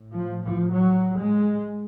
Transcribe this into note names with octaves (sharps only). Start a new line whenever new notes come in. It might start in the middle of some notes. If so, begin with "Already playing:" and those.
Already playing: A2
F3
F3
F#3
G#3